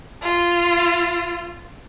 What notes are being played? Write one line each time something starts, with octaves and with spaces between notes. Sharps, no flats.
F4